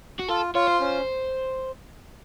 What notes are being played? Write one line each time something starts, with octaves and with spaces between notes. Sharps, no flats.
F#4
F4 A4
F4 C#5
C5
C#4